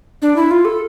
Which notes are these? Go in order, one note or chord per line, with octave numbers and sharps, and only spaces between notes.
D4
E4
F4
A4